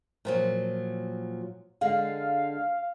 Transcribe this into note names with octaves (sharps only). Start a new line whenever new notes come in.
A#2 F3 F#3
D3 G#3 F5